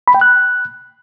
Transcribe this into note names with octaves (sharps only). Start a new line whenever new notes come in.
B5
G5
F#6